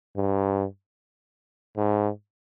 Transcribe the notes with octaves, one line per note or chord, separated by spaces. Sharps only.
G2
G#2